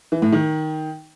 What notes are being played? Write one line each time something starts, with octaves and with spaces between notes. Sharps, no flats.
E3
A2
D#3